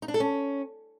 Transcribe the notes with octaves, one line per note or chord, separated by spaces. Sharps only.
D#4
D4
A4
C#4